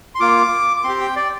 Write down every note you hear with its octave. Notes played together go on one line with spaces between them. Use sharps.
C6
A#3 F4 D6
D6
C4 G4 C6
G5
D5